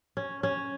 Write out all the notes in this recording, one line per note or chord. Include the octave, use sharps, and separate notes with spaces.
C#4
C#4